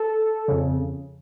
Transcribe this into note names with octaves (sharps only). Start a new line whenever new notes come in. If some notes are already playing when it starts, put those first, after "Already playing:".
Already playing: A4
F2 C#3